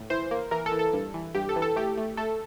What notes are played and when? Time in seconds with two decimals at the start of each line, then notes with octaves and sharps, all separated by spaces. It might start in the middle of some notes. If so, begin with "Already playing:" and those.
Already playing: A2
0.10 E3 C5
0.31 A#3
0.51 E3 A#4
0.66 A4
0.72 E3
0.79 A4
0.93 G2
1.14 E3
1.34 G2 G4
1.49 A4
1.56 E3
1.62 A4
1.76 A3 G4
1.97 A3
2.17 A3 A4